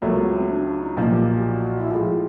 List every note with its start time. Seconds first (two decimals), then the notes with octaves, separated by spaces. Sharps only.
0.02 C#2 C#3 F#3 A3 A#3
0.18 B3
0.33 C4
0.49 D4
0.66 D4
0.81 D#4
0.97 B1 A#2 F3 A#3 F4
1.12 G4
1.28 F#4
1.38 G4
1.43 F#4
1.80 E4
1.91 A2 F3 G#3 F4